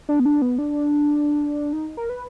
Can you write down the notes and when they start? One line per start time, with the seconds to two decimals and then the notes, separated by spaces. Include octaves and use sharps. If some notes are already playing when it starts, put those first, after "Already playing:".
0.09 D4
0.20 B3
0.25 D4
0.42 B3
0.58 D4
1.73 D#4
1.97 A#4
2.10 B4